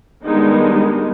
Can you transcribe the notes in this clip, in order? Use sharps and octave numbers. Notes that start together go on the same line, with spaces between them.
D#3 G3 G#3 B3 D4 D#4